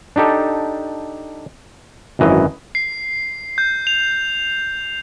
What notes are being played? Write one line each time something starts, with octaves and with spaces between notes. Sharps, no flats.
D4 D#4 G4 A4
G#1 F#2 E3 D#5
C7
G6
F7